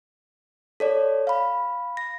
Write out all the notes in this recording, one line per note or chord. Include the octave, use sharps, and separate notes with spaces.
A4 C#5 D5
F5 B5
A#6